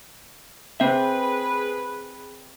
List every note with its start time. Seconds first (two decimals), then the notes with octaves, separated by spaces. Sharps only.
0.80 C4 G#4 B4 E5